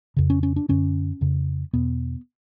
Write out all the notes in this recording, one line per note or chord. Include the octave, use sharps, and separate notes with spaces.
F2 C#3
C#4
C#4
D4
F#2 D3 C#4
F2 C#3
E2 B2 B3